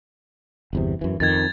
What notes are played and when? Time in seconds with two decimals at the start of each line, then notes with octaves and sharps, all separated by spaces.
0.73 G1 E2 C3
1.01 F#2 E3
1.20 F2 D#3 G#6 A6